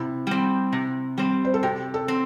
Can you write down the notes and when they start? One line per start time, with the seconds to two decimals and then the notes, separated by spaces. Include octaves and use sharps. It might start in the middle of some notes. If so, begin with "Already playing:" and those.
Already playing: C3 E4
0.27 G3 C4
0.73 C3
1.18 G3 C4
1.45 C5
1.54 A4
1.63 C3 G4
1.94 A4
2.08 C4